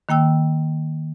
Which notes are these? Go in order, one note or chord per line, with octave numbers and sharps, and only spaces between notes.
D#3 A#3 G5 E6